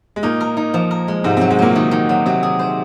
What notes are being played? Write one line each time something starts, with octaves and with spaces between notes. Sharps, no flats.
G#3
A#2 A#3 D#4
A#4
D#4
F3
A#4
G#3
G#2 C3 C4
C3 F#3 C4
G#3
A#2 F#3 A#3
D#3
D#3
F#3
C3 F#3 C4
G#4
C5